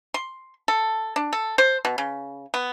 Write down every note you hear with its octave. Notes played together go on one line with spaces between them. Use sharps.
C6
A4
D4
A4
C5
B2
C#3
B3